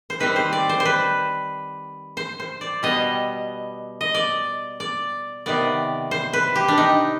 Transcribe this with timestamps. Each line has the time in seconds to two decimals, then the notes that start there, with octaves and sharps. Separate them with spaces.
0.10 C5
0.20 D#3 G3 C4 B4
0.36 C5
0.53 D5
0.69 C5
0.80 C5
0.85 B4
2.17 C5
2.40 C5
2.61 D5
2.83 B2 G3 B3 D#5
4.01 D#5
4.14 D5
4.80 D5
5.46 C3 D#3 B3 D5
6.11 C5
6.33 B4
6.55 G4
6.68 D4
6.78 D#4